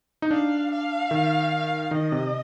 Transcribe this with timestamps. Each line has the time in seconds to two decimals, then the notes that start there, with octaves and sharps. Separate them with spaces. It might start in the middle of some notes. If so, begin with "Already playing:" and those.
0.22 D#4
0.31 D4 F5
0.71 F5
1.11 D#3
1.91 D#3 D#5
2.12 C3